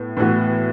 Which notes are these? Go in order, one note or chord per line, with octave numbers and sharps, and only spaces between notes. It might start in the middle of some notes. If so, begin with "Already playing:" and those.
Already playing: A2 B3
A2 E3 B3 F#4